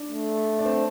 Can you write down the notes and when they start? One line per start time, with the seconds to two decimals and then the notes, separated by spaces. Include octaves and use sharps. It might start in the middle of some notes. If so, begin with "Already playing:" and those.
Already playing: D4
0.09 A3
0.59 D4
0.65 C4